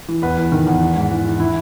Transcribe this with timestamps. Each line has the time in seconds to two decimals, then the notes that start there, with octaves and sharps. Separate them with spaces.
0.08 E3
0.22 E2 B4
0.37 E2
0.52 D#3
0.67 E2
0.81 E3
0.96 G#2
1.11 E3
1.25 E3
1.40 E3 E4